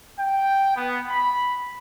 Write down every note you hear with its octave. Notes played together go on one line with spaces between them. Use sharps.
G5
B3
B5